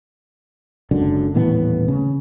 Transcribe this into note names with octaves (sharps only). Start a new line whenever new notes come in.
F#1 C#2 F#2 D3
D#1 A2 E3 B3
C#3